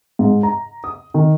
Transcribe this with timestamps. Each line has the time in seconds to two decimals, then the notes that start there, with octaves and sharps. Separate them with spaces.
0.19 G#2
0.43 A#5
0.84 D#6
1.14 D#3